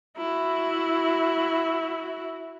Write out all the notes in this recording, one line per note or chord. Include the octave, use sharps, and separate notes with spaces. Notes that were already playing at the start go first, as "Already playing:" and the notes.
E4 F#4